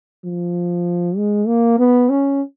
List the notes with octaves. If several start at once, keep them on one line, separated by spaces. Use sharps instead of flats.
F3
G#3
A#3
B3
C#4